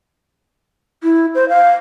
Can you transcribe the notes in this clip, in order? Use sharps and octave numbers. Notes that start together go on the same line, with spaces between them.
E4
C5
F5